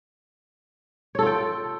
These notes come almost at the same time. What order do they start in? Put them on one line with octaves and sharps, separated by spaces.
C#5 A4 F4 G5